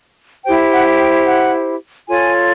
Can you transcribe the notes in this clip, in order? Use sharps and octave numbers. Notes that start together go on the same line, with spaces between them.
E4 G4 C5 G5
F#5
G5
F#5
F4 A4 C#5 G#5